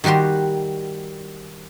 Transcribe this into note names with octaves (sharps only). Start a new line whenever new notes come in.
D#3 G3 F#4 G4 C6